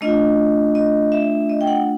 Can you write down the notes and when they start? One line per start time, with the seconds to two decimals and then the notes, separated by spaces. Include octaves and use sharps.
0.01 A3 D4 F4 D#5
0.75 D#5
1.12 E5
1.49 D#5
1.61 G5
1.67 F#5